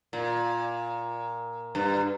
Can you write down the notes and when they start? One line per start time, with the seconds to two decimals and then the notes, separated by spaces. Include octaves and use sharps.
0.13 A#2
1.75 G2